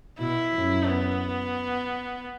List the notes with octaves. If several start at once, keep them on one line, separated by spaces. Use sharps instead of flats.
B2 E4
F#2
B3